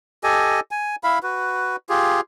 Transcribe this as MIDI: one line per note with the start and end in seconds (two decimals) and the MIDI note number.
0.24 0.60 67
0.24 0.60 69
0.24 0.60 75
0.24 0.60 80
0.71 0.96 80
1.04 1.19 64
1.04 1.19 77
1.04 1.19 83
1.23 1.76 66
1.23 1.76 71
1.89 2.21 65
1.89 2.21 67
1.89 2.21 68